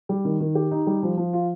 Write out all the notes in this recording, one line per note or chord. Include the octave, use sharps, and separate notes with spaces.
G3
D#3
D#3
G4
D#4
G3
F3
F3
F4